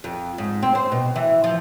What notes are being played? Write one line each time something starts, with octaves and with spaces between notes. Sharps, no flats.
F2
G#2
C4
C5
B2
E3
F3